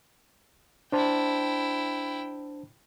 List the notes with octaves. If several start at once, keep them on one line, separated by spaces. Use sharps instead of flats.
D4 E4 C5 G5 A5